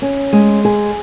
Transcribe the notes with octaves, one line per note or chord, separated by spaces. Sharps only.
C#4
G#3
G#4